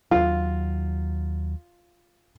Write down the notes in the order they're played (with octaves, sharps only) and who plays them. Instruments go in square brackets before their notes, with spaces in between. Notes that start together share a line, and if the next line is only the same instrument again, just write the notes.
[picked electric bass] D#2 F#3 [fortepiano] F4